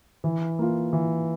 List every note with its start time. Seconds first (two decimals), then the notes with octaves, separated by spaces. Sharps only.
0.24 E3
0.59 A#3 F4
0.93 E3